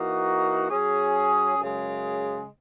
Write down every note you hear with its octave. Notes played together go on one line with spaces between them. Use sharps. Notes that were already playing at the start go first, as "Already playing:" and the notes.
Already playing: E3 A#3 D#4 F#4
F#3 C#4 G#4
F#2 C#3 G#3